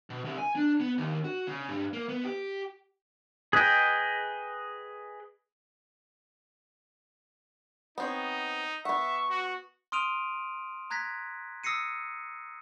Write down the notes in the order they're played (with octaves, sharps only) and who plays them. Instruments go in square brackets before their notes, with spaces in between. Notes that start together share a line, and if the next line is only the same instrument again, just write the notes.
[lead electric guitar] B2
C2
G#5
D4
B3
D#2
F#4
C#3
G2
A#3
B3
G4
[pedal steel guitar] G#4 B4 D#5 G5
[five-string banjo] B3 C4 C#5 [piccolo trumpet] D#4
[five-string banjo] B3 F#5 [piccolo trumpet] E5 [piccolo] C#6
[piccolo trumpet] F#4
[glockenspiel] C6 D#6 F6 D7 D#7 F7
A#5 F#6 G#6 A#6 B6
D#6 E6 A#6 C7 C#7 D#7